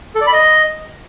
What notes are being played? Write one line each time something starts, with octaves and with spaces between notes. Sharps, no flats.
A4
D5
B5
D#5